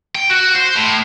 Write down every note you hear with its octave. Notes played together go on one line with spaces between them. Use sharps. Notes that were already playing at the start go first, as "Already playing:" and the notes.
G5
F#4
C5
A2